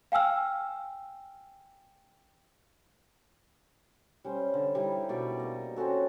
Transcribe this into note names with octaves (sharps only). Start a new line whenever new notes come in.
F5 G5 G#5 E6 F6
G3 C#4 C5
D3
G3 D#4 E4
B2 D5 G5 C#6
A#3 D#5
C4 C#4 F#4 A4